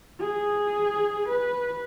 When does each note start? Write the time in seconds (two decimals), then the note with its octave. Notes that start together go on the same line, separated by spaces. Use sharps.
0.20 G#4
1.29 B4